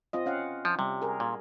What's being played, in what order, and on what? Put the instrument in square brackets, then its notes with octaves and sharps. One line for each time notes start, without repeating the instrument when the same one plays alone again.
[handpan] C4 F4 D#5
C#4 F5 F#5
[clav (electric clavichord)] F3
[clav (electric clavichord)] C3 [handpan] G3
[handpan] G#4 A#4
[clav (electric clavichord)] A#2